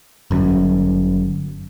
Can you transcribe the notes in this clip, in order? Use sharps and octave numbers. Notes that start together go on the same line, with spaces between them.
G1 F#2